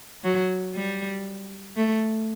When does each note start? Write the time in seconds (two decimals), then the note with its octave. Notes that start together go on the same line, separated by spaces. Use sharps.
0.24 F#3
0.75 G3
1.77 A3